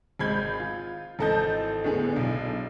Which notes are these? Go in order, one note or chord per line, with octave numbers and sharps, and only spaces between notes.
G#1 G#3 B5 G6 G#6
F4
G#1 E3 A4 D#5 A5 G6
A2 D3 B3 G#4
B1 D4